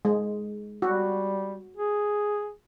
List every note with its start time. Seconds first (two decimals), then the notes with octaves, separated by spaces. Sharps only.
0.05 G#3
0.82 G3 F#4
1.77 G#4